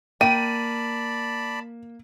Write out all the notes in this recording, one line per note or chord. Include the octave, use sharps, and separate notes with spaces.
A#3 D5 G5 A5 B5 D#7